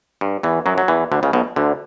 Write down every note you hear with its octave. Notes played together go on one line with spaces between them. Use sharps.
G2
E2 E3
F#2 F#3
F#3
E2 E3
D2 D3
C#2 C#3
B1 B2
D2 D3